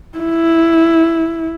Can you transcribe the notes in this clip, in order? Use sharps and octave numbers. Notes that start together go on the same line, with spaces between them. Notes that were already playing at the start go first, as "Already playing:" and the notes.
E4